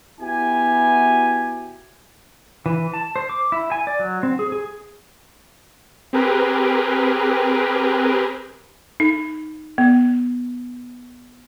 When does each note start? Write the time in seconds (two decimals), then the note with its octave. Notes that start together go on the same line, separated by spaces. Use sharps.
0.21 B3 E4 F#4 G4 G#5
2.66 E3
2.94 A5
3.16 C5
3.29 D6
3.52 E4
3.71 G#5
3.87 D5
3.99 F#3
4.23 C4
4.39 G#4
4.52 G#4
6.13 C4 G4 G#4 A#4 B4
9.00 D#4
9.78 B3